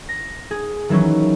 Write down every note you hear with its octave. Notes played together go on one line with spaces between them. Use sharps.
A#6
G#4
D#3 E3 F#3 C#4